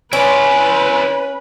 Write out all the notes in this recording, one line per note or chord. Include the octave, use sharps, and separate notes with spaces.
C#4 E4 B4 D5 G#5 C6